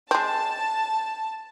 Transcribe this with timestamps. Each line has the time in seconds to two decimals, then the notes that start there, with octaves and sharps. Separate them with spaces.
0.11 G#3 C4 A5